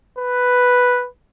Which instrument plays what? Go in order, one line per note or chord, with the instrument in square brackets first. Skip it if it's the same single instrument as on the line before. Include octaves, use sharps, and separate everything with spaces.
[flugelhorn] B4